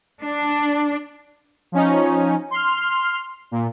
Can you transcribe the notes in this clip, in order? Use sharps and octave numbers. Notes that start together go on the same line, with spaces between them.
D4
F3 C#4 D#4
C6 F6
A#2